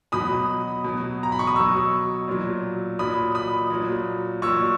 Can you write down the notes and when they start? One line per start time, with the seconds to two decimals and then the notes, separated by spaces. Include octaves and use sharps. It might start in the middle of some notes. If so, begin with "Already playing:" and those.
0.12 B2 F#3 B5 D#6
0.84 B2 F#3
1.23 A#5
1.32 B5
1.39 C#6
1.47 D#6
1.56 B2 F#3 C#6 E6
2.28 A#2 F#3
2.99 A#2 F#3 B5 D#6
3.35 B5 D#6
3.70 A#2 F#3
4.42 A#2 F#3 C#6 E6